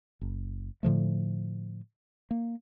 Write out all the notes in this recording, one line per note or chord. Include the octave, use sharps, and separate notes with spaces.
F#1
A2 D3 F3 A3
A#3